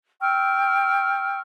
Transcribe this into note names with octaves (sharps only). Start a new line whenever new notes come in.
G5 C#6 E6 F6